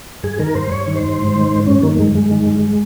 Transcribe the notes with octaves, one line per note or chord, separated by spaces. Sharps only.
G2 G#4
D#3 A#4
G2 C5
G2 C#5
D#3
C5
G2
G#2
D#3
G#2
G2 C#4
D#3 A#3
G2 G#3
G2 G#3
D#3
G2